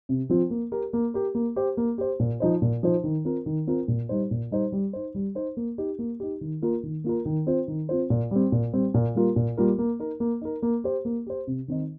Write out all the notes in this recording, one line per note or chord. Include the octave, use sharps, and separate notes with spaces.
C3
F3 C4 F4
A#3
G4 A#4
A#3
G4 A#4
A#3
G4 C5
A#3
G4 C5
A#2
F3 D#4 C5
A#2
F3 D#4 C5
D#3
C4 F4 A#4
D#3
C4 F4 A#4
A#2
G3 D#4 C5
A#2
G3 D#4 C5
G3
D#4 C5
G3
D#4 C5
A#3
D#4 G4
A#3
D#4 G4
D#3
A#3 F4 A#4
D#3
A#3 F4 A#4
D#3
C4 F4 C5
D#3
C4 F4 C5
A#2
G3 C4
A#2
G3 C4
A#2
G3 A#3 F4 A#4
A#2
G3 A#3 F4 A#4
A#3
D#4 A#4
A#3
D#4 A#4
A#3
G4 C5
A#3
G4 C5
C3
D#3 C4 D#4